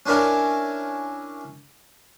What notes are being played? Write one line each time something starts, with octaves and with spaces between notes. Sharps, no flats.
C#4 D4 E4 A#4 G#5 A5